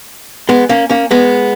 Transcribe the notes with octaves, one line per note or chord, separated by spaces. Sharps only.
G#3 B3
A#3 C#4
A#3 C#4
G#3 B3